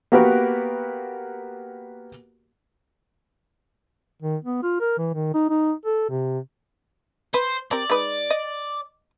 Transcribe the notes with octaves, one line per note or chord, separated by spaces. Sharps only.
A#3 B3 F#4 G4 A#4 B4
D#3
B3
F4
A#4
E3
D#3
D#4
D#4
A4
C3
B4 C5
C4 G4 A#4 D5
G#3 D#4 B4
D#5